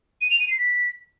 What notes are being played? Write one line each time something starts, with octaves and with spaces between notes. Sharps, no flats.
D#7
F7
D#7
C7
B6